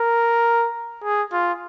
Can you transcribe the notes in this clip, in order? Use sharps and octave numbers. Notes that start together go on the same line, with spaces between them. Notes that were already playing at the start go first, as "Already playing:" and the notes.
Already playing: A#4
G#4
F4